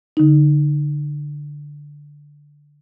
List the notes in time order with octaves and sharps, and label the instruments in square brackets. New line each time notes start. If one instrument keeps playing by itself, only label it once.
[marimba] D3 D#4